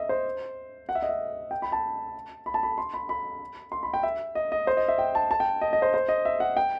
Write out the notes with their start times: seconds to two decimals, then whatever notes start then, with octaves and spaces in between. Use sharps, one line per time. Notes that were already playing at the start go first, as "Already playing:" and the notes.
Already playing: D#5 E5
0.09 C5
0.89 F#5
0.95 E5
1.02 D#5
1.09 E5
1.51 G5
1.62 B5
1.72 A5
2.46 B5
2.54 A5
2.63 B5
2.78 C6
2.94 B5
3.09 B5
3.72 C6
3.83 B5
3.94 G5
4.03 E5
4.35 D#5
4.52 D#5
4.67 C5
4.77 D#5
4.88 E5
4.99 G5
5.15 A5
5.31 A5
5.40 G5
5.61 D#5
5.73 D#5
5.82 C5
5.94 C5
6.09 D#5
6.25 E5
6.40 F#5
6.57 G5